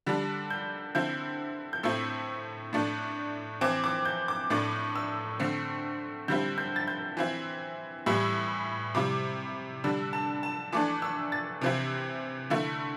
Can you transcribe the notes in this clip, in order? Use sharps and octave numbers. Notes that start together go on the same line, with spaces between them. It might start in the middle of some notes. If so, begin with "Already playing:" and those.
D3 G3 D4
G6
D3 C4 E4 G6
G6
A2 A3 C4 E4 E6
A2 A3 D4
E3 C4 E4 D6
D6
G6
D6
A2 A3 D4 D6
E6
D3 A3 C4
D3 G3 C4 E4 G6
G6
A6
G6
E3 C4 E4
A2 E3 G3 E4 E6
C3 G3 E4 D6
D3 G3 D4 E6
A5
A5
E3 A3 D4 D6
E6
A6
C3 E3 C4 E4
D3 A3 E4